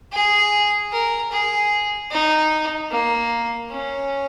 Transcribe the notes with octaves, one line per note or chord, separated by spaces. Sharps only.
G#4
A#4
G#4
D#4
A#3
C#4